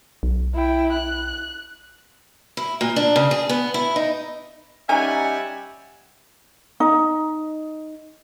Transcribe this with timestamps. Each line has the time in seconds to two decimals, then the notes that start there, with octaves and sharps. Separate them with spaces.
0.23 B1
0.55 E4 G5
0.92 F#6
2.57 E4
2.81 A#2
2.96 D4
3.16 C#3
3.31 G#4
3.49 B3
3.74 E4
3.96 D#4
4.89 G3 C#4 D#4 E5 F#5 G#5
6.80 D#4